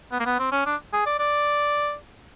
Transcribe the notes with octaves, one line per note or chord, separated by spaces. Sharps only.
B3
A#3
B3
C4
C#4
D4
G#4
D5
D5